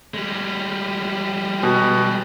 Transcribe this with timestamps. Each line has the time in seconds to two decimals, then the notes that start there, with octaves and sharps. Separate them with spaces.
0.14 G3 G#3
1.63 B2